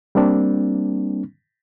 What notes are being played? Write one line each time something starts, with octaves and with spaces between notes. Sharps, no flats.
G3 A#3 C4 D4